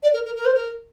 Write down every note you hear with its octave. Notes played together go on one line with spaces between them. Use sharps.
D5
A#4
A#4
A#4
C5
A#4